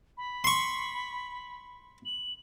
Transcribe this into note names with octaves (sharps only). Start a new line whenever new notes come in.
B5
C6 C#6
F#7